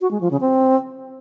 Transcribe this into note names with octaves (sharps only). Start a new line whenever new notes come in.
F#4
G#3
F3
C#3
C4